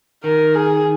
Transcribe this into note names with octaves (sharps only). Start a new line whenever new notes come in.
D#3 A#4
G#4